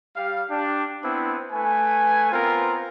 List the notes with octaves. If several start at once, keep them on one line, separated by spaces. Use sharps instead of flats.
G3 F5
D4 G4
B3 C4 D4 E4
A3 B4 G#5
B3 C4 F4 A#4